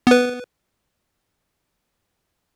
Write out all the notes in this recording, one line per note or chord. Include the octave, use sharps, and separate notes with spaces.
B3 B4